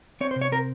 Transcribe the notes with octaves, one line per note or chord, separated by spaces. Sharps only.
C4 C#5
C5
C3
C#5
C4 A#4